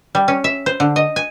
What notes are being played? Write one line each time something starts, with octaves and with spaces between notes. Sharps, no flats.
G3
C#4
E5
C5
D3
D#5
G#5